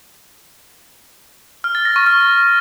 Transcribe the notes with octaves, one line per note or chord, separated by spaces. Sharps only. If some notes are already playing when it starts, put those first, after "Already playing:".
F6
A6
A#6
C#6
F6